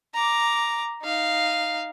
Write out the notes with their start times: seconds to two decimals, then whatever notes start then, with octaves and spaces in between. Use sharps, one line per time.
0.14 A#5 D6
1.02 D#4 F5